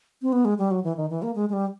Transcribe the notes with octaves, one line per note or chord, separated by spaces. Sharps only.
C4
B3
G#3
G3
F#3
E3
D#3
E3
A#3
G#3
G#3
G3